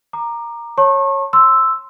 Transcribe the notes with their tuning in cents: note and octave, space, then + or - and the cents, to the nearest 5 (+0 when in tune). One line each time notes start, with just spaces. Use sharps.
A#5 +0 D6 +30
C#5 -15 A5 +25 C#6 -35
C6 -5 E6 +0